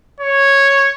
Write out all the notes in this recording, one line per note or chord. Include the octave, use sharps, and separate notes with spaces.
C#5